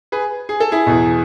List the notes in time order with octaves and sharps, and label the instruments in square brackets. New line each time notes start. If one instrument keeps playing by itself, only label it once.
[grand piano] G#4 B4
G#4
A4
E4 G#4
E2 B2